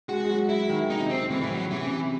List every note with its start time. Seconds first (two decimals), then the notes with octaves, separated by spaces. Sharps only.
0.08 G#3 F#4
0.24 G#3
0.29 F#3
0.49 F#3 E4
0.69 D#3
0.90 C3 D#4
1.10 C4
1.30 A2 E3
1.41 E3
1.50 F#3
1.71 C3 E3
1.81 C#3
1.90 C3